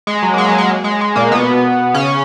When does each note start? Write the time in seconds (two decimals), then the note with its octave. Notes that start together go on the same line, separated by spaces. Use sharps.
0.07 G#3
0.23 F#3
0.34 A#3
0.38 G#3
0.48 F#3
0.58 G#3
0.84 G#3
1.01 G#3
1.16 A#2 A#3
1.31 B2 B3
1.94 C#3 C#4